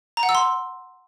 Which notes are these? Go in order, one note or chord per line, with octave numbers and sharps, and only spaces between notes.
A#5
F#5
E6
C6